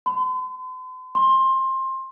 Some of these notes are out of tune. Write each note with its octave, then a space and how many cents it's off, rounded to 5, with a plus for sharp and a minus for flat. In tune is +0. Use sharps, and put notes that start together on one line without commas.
C6 -45
C6 +20